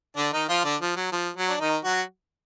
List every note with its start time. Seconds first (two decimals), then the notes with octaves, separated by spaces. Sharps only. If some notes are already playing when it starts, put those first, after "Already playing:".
0.16 D3 D4
0.33 D#3 D#4
0.49 F3 F4
0.64 D3 D4
0.81 F3
0.96 F#3
1.12 F3
1.36 F#3
1.49 D4
1.60 D#3 D#4
1.85 F#3 F#4